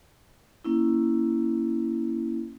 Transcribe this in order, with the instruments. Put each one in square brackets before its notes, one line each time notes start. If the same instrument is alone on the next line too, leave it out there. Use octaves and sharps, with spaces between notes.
[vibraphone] A#3 C#4 E4